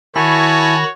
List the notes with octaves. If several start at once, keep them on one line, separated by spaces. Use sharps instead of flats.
D#3 E4 F#4 C#5 G#5 A5 B5 A#6